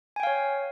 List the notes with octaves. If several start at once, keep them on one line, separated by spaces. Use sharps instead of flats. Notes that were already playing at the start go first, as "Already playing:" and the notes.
C#5 F5 G5 G#5